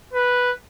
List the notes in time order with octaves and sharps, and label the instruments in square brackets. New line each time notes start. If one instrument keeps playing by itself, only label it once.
[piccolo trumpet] B4